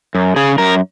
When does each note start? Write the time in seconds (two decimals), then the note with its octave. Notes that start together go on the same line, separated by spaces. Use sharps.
0.15 F#2
0.36 C#3 G#4
0.58 F#2 A#4